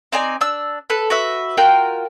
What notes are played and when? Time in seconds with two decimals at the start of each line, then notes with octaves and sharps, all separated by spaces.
0.12 C4 D#4 D5 G#5
0.41 D4 E6
0.90 A4 B4
1.10 F#4 B4 E5
1.57 F4 F#4 A#4 G5